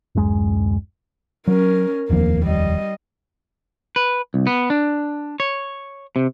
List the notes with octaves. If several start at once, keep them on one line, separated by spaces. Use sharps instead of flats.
D1 F#2 G#3
F#3 C#4 A#4
F1 D#2 F3 A#3
G3 D#5
B4
C2
B3
D4
C#5
C3